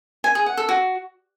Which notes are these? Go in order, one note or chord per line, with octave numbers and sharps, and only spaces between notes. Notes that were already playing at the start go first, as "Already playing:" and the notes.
G#5
G#4
F#5
A4
F#4